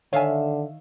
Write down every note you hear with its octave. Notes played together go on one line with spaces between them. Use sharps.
D3 D#3 C#5 E5 F5 G#5